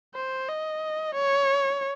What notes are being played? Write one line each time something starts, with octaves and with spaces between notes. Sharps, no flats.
C5
D#5
C#5